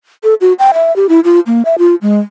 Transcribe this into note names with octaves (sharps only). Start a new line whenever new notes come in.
A4
F#4
G5
E5
G4
E4
F4
A#3
E5
F4
G#3